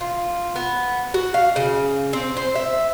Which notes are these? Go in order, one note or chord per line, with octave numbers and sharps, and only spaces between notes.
F4
B3
F#4
F5
C#3
C4
C5
E5